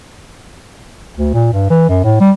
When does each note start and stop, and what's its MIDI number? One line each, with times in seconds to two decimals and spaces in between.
1.17 1.33 38
1.34 1.48 46
1.53 1.66 43
1.70 1.89 52
1.89 1.99 42
2.04 2.18 45
2.20 2.31 55